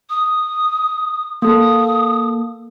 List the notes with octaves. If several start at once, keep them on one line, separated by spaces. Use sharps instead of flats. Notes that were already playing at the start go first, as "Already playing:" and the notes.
D#6
A#3 A4 D#6